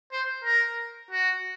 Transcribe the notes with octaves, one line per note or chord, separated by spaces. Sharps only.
C5
A#4
F#4